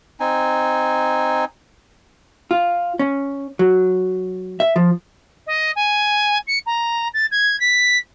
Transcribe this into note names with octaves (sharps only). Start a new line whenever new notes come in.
C4 D#4 G#5
F4
C#4
F#3
E5
F3
D#5
G#5
C#7
A#5
A6
G#6
B6